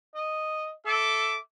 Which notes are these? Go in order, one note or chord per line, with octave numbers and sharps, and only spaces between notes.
D#5
A4 E5 D6